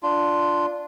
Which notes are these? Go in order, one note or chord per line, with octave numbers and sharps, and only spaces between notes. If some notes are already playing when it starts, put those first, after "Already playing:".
D4 F4